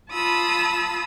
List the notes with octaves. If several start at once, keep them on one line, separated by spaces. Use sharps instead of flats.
F4 A5 B5 D#6 E6